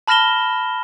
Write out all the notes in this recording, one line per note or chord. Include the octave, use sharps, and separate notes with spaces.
A5 B5 F6 A#6 E7 G7